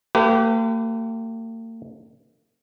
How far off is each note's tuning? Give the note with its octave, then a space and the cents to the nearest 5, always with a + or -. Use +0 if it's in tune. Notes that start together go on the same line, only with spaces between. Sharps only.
A#3 -45 G4 -20 B4 +30